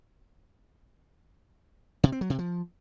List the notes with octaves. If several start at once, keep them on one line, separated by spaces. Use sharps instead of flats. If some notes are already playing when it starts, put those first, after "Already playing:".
C3
C4
F#3
C3
F3